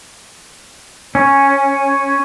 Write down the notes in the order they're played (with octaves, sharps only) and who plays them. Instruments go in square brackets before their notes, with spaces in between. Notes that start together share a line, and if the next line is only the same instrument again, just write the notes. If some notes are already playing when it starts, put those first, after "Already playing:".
[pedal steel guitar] C#4